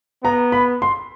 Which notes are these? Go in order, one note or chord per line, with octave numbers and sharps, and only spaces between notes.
B3 A#5
B5
C6